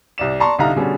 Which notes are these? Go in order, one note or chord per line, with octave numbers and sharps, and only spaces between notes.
C2 D5 E7
D5 A5 A#5 C6 C#6
C2 D3 D#4 F5 A#5
B2 D3 G3 C#4 G#4